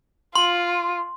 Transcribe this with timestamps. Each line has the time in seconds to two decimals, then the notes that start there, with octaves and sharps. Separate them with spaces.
0.36 F4 C6